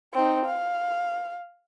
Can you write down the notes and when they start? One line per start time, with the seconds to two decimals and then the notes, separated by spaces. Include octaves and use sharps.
0.13 C4 D#4
0.46 F5